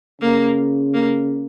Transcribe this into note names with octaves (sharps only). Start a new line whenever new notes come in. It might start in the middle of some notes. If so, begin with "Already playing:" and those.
C#3 A#3
A#3